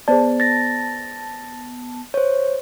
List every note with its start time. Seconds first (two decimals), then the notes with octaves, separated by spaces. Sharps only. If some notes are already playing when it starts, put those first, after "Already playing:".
0.08 B3 G#4 C5 D5 A5
0.40 A6 A#6
2.14 C5 C#5